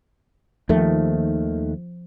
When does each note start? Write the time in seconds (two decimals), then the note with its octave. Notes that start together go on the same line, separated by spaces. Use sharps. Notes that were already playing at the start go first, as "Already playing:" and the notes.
0.69 D#2 D#3 F3 A3